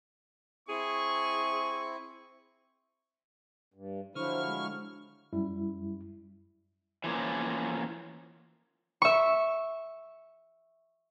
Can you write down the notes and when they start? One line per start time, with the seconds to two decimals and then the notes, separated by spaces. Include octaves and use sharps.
0.69 C4 E4 G#4 C#6
3.74 G2
4.15 D3 F3 F#3 E4 C5 C#6 F6
4.46 G#3
5.33 F#2 G3 E4
7.04 E3 F3 A#3 C#4
9.02 E5 C#6